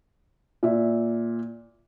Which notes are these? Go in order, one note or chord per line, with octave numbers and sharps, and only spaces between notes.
A#2 E5